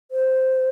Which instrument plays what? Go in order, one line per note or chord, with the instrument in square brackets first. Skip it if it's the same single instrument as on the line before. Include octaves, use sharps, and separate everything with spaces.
[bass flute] C5